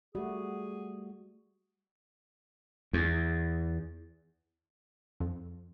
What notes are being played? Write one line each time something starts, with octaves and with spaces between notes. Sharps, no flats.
G3 A3 F#4 G#4
E2
F2